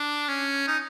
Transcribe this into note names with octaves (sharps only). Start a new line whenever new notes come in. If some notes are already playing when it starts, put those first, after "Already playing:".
Already playing: D4
C#4
D#4